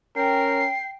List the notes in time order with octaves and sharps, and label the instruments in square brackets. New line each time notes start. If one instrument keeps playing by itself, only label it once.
[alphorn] C#4 [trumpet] A#4 [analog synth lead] G5 [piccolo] C7